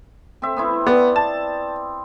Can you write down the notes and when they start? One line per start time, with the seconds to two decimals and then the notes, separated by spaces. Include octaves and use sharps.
0.42 C4 E5
0.56 B3 C4 E4
0.87 B3 D5
1.16 A5